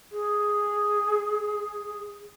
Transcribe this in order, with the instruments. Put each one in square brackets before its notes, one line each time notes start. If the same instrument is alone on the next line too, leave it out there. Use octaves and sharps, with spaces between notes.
[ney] G#4